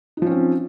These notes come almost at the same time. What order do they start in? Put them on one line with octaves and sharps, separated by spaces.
D#4 F3 C#4 C4